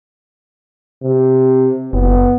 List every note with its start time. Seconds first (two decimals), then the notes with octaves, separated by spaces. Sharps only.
1.02 C3
1.93 F#1 B3